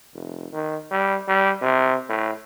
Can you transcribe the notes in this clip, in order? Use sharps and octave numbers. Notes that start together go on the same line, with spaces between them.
F1
D#3
G3
G3
C3
A2